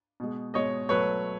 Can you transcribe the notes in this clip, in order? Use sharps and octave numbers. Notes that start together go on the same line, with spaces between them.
B2 G#3
B2 G#3 C#5 D#5
B2 F#3 A3 B4 C#5